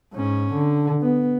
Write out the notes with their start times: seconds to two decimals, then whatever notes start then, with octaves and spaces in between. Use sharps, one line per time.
0.13 G#2 C#4
0.54 D3
1.01 B3